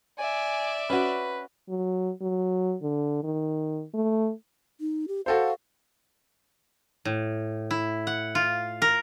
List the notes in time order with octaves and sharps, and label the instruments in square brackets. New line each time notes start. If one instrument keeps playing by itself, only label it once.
[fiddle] D5 E5 [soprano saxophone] G#5
[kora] C#4 F#4 [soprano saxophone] B4
[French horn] F#3
F#3
D3
D#3
A3
[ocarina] D#4
G4
[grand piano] F#4 A4 C5 [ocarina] F5
[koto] A2
E4
F#5
F4
A#4